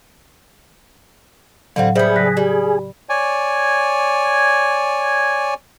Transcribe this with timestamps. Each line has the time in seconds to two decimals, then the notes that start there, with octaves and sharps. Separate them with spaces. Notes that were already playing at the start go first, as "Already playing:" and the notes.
1.76 A2 D3 F#3 G3 C4 F5 F#5
1.95 G3 B3 G#4 C5 E5 G6
2.16 C#3 F#3 F#6 A#6 B6
2.37 G3 G4
3.09 C#5 D5 G#5